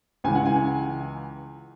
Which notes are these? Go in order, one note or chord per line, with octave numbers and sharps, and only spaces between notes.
C#2 C#3 E3 G#5
F#5
G#5